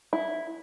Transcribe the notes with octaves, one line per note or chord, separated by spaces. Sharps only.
E4